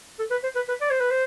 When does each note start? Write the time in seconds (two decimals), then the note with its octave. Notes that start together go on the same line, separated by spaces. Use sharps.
0.19 A4
0.31 B4
0.43 C5
0.55 B4
0.69 B4
0.81 D5
0.90 C5
1.00 B4
1.11 C5